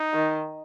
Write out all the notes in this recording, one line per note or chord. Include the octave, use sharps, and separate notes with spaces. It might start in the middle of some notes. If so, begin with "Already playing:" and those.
Already playing: D#4
D#3